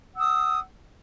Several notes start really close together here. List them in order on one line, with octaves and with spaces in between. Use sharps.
F#5 E6 D#6